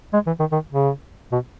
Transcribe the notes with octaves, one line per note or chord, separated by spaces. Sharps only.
G#3
E3
D#3
D#3
C#3
B2